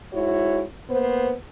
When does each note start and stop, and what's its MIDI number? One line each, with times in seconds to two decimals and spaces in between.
0.12 0.62 44
0.12 0.62 64
0.12 0.62 66
0.12 0.62 73
0.90 1.31 58
0.90 1.31 59
0.90 1.31 72